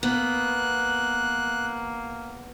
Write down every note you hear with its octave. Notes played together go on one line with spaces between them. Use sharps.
A#3 B3 F#6